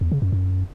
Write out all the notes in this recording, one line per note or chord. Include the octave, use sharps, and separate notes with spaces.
E2
C#3
F#2
F#2